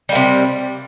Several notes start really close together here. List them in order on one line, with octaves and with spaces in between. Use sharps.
G3 A#3 C3